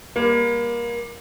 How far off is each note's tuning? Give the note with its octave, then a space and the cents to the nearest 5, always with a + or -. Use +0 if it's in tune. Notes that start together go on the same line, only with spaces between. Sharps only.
G3 +40 A#3 +25